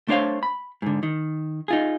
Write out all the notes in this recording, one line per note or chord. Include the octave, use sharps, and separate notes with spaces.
A3 D4 C5 C#5 F5
B5
G#2 D3
D#3
D#4 F4 G#4